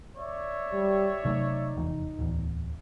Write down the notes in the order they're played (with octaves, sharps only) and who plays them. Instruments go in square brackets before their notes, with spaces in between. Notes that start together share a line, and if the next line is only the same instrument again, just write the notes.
[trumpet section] C#5 D5 E5
[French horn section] G3
[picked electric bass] C3 F#3 A3 [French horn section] D#4
[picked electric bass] F1 E2
D1 E2